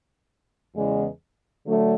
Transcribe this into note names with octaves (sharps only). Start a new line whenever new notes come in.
E2 C#3 G#3
D3 F#3 A3